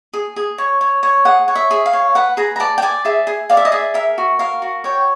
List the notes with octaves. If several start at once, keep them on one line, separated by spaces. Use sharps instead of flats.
G#4
G#4
C#5
C#5
C#5
G#4 F#5
C#5
E5
G#4
F5
C#5
B4 F#5
G#4 A#5
A#5
D5 A5
G5
D5 G#5
G#4 E5
G#4
D5 F5
E5
D#5
G#4 E5
A#4 E5
F#4
A#4 F5
F#4
C#5 G5